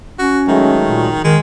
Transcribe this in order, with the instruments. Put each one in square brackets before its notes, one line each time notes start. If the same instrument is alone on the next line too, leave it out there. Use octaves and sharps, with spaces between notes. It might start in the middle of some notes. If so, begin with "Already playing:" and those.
[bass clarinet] C#4 [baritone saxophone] F#4
[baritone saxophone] D#3 [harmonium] F#3 G#3 A3
[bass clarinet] A#2
[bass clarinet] D#3 [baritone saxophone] G#3